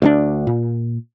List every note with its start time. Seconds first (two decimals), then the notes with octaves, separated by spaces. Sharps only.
0.02 D2 G3 D4
0.47 A#2